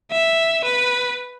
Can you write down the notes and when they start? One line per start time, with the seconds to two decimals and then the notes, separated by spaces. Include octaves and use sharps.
0.11 E5
0.64 B4